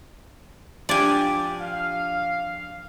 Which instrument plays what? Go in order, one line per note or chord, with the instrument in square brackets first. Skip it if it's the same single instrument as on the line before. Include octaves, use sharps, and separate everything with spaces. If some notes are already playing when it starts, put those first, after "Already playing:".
[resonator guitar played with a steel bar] F3 D4 G4 [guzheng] D5 G#5
[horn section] F5